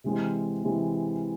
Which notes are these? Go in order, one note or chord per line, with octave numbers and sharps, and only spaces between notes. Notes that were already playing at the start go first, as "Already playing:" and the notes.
C3 E3 G#3 C4
C3 E3 G#3 C4